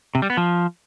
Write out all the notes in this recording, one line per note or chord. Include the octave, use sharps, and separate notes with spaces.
C3
G3
B3
F3